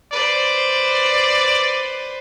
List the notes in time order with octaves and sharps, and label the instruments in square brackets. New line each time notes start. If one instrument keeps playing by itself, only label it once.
[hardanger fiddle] B4 C5 [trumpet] D5